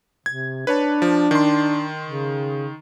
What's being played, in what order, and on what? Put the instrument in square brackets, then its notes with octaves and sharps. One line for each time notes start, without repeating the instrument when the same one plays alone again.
[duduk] C3 [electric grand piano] G#6
[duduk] D4 [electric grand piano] B4 C#5 A5
[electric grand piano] F3
D#3 C6
[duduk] C#3